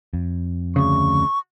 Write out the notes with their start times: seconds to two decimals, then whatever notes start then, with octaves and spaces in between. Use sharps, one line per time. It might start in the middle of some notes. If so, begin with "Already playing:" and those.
0.13 F2
0.76 D2 C#3 C#6